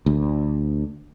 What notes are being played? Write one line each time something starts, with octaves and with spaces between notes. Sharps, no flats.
D2